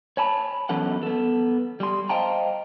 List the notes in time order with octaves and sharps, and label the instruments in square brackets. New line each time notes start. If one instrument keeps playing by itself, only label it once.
[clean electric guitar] C#5 G#5 A5 B5
E2 E3 F#3 C#4 A4 F#5
B3 A4
G3 C6
C5 D#5 F5 G5 A5 A#5